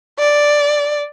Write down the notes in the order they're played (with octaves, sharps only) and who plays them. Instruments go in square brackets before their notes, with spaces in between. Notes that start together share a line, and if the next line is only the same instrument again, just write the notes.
[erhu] D5